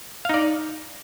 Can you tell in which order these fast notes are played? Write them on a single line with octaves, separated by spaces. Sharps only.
F5 D#4 D5